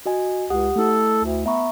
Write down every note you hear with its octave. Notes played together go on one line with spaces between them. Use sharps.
F#4 D#5 G#5
C#2 G4 F#5 D#6
A3 E4 A4
D2
B3 E5 A#5 C#6